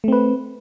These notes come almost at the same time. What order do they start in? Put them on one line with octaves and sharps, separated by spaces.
A3 C4 B4